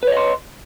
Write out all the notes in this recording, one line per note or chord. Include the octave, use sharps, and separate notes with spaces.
B4 C#5 D#5 C6